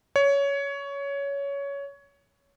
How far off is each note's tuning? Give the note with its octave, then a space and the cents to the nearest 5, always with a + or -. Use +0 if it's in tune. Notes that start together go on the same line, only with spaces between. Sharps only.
C#5 +15